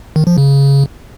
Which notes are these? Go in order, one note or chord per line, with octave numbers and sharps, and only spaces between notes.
D#3
F3
C#3